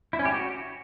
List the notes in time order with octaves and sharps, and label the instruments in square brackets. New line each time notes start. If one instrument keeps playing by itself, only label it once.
[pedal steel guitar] E4
C#4
G4
F#4